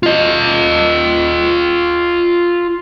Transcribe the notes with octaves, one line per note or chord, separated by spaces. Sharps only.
F4 D#5